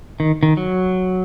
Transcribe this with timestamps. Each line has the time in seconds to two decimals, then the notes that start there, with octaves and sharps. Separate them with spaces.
0.20 D#3
0.43 D#3
0.57 F#3